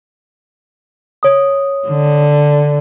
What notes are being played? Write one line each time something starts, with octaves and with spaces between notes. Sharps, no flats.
C#5 D#6
D3